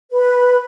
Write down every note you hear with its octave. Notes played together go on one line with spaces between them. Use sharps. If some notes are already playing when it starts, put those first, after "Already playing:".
B4